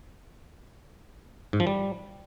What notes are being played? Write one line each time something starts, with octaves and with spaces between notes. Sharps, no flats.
G#2
F3
G3